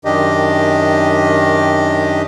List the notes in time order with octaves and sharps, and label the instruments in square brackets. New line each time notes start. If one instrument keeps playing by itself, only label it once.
[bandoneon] F#2 D#3 D4 G4 D#5